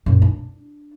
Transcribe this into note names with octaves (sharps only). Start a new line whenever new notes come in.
F#2 A#2
D4